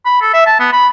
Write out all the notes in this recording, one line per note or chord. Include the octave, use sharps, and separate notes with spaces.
B5
A4
E5
A5
B3
B5